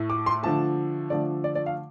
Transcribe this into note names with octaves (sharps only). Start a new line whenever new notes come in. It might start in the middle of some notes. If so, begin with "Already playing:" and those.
Already playing: A2 A3
D6
C6
D3 F3 A3 A5
D3 F3 A3 D5
D5
D5
F5